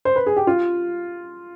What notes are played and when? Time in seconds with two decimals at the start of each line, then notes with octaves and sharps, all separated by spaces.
0.05 C5
0.16 B4
0.26 G#4
0.37 G4
0.47 F4